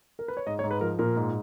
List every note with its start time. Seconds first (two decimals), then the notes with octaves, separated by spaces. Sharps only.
0.19 A#4
0.28 B4
0.37 C#5
0.46 G#2 D#5
0.59 C#5
0.64 G#2
0.71 B4
0.81 F3 A#4
0.99 A#2 A#4
1.16 G#2